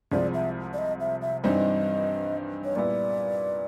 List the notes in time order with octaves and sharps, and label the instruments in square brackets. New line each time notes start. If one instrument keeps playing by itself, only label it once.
[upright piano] C2 C3 F3 G#3 C4 [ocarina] D5
[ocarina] E5
D5
D#5
E5
E5
[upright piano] G2 E3 G3 C4 D#4 [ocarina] D#5
[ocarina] C#5
[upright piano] A#2 G3 B3 E4 [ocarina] D5